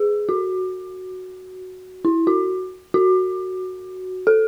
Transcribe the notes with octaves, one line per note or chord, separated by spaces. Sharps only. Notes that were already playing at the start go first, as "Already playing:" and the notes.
Already playing: G#4
F#4
E4
F#4
F#4
A4